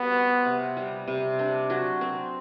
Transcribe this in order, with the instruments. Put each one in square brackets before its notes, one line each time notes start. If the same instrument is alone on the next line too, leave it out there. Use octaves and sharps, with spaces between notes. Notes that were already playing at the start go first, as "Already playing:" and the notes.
Already playing: [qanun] G3 F#4 [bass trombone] B3
[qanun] C4
C3
G3
C3
D4
F#3
C4